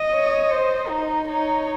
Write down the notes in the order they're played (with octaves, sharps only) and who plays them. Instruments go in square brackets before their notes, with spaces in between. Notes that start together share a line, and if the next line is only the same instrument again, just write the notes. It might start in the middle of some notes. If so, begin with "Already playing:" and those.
Already playing: [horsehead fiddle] D#5
[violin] C#5
C5
D#4
[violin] D#4 [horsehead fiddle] C#5